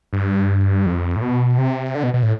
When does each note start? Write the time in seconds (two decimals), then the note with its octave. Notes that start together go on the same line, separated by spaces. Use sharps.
0.13 G2
0.86 F2
1.16 A2
1.22 B2
1.58 C3
1.95 D3
2.03 B2
2.14 B2
2.23 A2